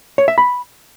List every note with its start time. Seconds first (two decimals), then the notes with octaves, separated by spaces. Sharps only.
0.18 C#5
0.28 E5
0.38 B5